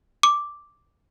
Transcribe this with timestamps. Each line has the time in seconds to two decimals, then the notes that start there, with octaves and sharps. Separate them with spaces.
0.23 D6